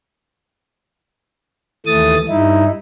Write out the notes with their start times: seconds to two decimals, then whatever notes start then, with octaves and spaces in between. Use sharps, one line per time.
1.86 D#2 E3 A3 D#6 A6
2.29 G2 D#4 E4